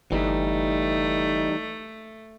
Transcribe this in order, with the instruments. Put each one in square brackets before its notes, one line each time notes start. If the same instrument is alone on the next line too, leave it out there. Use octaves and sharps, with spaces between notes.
[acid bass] G1 [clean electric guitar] E3 G3 [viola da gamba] A3 [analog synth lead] D#4